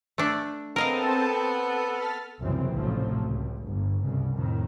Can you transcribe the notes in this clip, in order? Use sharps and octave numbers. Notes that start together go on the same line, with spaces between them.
A3 D4
B3 C4 A4 A#4 D#5 F5 A5
A4
F6 A6 B6
C2 F#2 A#2 C#3 E3 C4
A1 D2 C3 F3 F#3 A3
C#2
G1
C2 G2 C#3
F2 A2 D#3